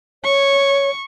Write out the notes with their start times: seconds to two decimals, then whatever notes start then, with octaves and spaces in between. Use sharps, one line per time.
0.24 C#5 C#6